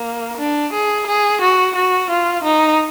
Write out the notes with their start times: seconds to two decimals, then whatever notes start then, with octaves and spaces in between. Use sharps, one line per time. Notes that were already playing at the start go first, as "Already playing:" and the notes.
Already playing: A#3
0.37 D4
0.73 G#4
1.07 G#4
1.41 F#4
1.76 F#4
2.10 F4
2.44 D#4